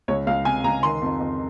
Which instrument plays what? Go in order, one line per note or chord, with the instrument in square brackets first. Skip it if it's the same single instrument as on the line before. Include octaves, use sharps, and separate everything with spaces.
[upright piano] C#2 C#5
C#2 F5
C3 G#5
C#2 A#5
D#3 C6
F2
F2